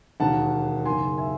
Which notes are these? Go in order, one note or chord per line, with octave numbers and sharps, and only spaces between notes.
E1 D#2 D#3 F#5 A5
F#1 E2 D#3 G#5 C6
E5 G#5